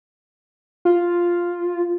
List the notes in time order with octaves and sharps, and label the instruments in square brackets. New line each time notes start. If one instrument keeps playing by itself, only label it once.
[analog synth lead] F4